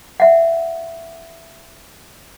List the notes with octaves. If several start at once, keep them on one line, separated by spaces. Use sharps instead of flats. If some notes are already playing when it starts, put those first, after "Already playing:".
E5 F#5